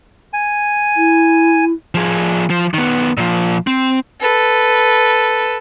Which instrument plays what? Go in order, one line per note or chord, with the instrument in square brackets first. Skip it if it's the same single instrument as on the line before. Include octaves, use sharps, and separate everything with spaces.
[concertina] G#5
[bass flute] E4
[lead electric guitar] F3 G#4
F3
D#3 B3
A#2 F3
C4
[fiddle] A4 B4